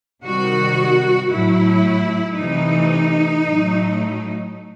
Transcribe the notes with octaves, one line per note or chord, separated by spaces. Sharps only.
C3 D#3 G3 F#4
A2 F#3 A3 E4
C3 E3 A3 D#4
A2 F#3 A3